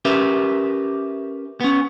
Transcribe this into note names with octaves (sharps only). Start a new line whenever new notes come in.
C#4 G4 A#4 B4 E5
B3 C#4